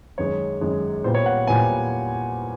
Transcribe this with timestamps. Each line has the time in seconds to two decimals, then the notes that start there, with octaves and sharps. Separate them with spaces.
0.18 F#2 D#3 G#3 C#5
0.61 F#2 D#3 G#3
1.04 A#2 G3 B3 C5
1.15 C#5
1.26 F#5
1.47 A#2 G3 B3 G#5